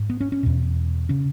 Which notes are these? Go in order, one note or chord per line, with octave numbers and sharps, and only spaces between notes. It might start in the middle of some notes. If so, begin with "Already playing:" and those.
Already playing: G#2
B3
C#4
C#4
E2 B2
C#3 C#4